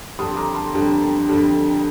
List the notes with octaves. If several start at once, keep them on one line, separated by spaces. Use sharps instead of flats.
F2 D3 G3 D4 C6 D#6
A#5 D6
A5 C6
F2 D3 G3 D4
F2 D3 G3 D4